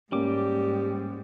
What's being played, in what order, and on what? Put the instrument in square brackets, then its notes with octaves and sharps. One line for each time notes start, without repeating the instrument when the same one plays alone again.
[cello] G#2 [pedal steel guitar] G3 D6 [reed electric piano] A#3 C#4 [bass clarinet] G4